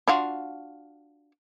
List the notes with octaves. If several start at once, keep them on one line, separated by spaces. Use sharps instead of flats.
D4 F4 F#4